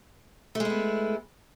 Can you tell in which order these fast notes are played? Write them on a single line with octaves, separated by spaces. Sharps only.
A3 G#3 E4 B3